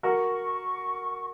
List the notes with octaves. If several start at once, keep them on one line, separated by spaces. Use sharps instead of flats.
F#4 A#4 C#6